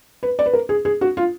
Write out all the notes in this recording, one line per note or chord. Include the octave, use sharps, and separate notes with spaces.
B4
D5
B4
A#4
G#4
G#4
F#4
F4